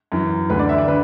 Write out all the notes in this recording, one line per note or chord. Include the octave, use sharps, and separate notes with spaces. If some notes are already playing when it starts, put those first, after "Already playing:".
F#2 E3
D2 D3 B4
D5
E5
D5
D3 B4